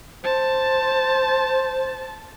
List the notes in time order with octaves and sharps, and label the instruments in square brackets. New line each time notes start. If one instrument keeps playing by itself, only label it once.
[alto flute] C5 [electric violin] A5